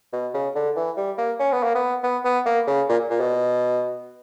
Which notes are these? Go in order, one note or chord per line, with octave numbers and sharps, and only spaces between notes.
B2
C#3
D3
E3
G3
A#3
C#4
B3
A#3
B3
B3
B3
A#3
C#3
A#2
A#2
B2